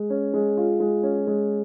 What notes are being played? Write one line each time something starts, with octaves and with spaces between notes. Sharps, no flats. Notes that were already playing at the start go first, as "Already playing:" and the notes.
Already playing: G#3
C#4
G#3
F4
G#3
C#4
G#3